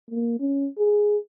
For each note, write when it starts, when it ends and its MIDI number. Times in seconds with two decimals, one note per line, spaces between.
0.10 0.37 58
0.40 0.68 61
0.78 1.17 68